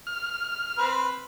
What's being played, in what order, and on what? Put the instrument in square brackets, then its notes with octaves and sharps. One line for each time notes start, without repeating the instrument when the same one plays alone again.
[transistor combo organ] F6
[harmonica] C4 B4